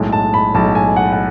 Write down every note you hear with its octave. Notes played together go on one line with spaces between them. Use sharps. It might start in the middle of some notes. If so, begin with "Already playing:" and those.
Already playing: B1 A2 G#3
A5
B5
B1 A2 G#3 A5
G#5
F#5
F#5